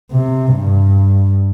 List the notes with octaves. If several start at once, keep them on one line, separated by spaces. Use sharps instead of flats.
C3
G2